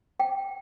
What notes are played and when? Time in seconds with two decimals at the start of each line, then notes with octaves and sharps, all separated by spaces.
0.20 G5